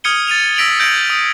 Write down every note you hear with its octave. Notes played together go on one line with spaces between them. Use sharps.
D#6 F6 G#6 C#7 D#7 G7
A6 D#7 F7
E6 A#6 B6 D7 F7 F#7
G6 G#6 A#6 D7 F#7
D#6